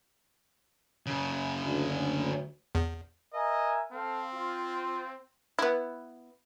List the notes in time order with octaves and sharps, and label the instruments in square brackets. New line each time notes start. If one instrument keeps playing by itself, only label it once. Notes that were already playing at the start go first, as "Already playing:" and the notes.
[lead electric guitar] F#2 C#3
[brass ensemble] D2
[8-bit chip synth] E2
[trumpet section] A#4 E5 G#5 [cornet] D#5
[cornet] C4 [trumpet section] A4 F5
[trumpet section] F4
[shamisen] B3 E4